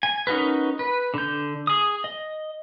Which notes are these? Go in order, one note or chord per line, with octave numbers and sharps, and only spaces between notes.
G#5
C#4 D#4 F#4 A#4 B4
B4
D3 G6
G#4 D#6
D#5